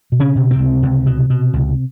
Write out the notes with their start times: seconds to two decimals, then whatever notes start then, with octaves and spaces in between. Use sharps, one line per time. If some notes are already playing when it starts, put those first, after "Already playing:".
0.12 B2
0.20 C#3 C#4
0.36 B2
0.51 C3 C4
0.59 C#2
0.83 C#2
1.06 B2
1.30 B2
1.54 C#2